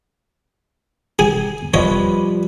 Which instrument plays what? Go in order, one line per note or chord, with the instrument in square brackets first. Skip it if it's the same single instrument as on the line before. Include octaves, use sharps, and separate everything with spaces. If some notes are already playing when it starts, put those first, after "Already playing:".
[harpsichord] G#4 G#5
[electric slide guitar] F3 G3 B4 [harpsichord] C#5 D#5